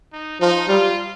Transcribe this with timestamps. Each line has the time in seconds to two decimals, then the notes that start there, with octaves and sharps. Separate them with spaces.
0.13 D#4
0.41 F3 D#4
0.68 G3 F4